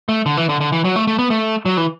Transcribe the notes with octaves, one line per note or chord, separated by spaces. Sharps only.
A3
D3
E3
D3
D3
E3
F#3
A3
A3
B3
A3
F#3
E3